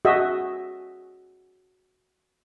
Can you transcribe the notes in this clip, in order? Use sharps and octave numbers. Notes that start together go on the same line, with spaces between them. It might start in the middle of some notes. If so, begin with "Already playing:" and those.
F#4 G#4 D#5 E5